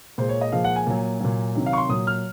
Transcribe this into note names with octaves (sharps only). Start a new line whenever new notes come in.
A#2 G#3 C5
C#5
D#5
A#2 F3 G#3 F5
F#5
G#5
A#2 F#3
A#2 F#3
C3 D#3 F#3
F5
C#6
C6
A#2 F#3 D#6
F6